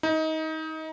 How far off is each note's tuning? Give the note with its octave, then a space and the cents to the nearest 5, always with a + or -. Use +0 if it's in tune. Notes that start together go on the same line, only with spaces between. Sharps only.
D#4 +25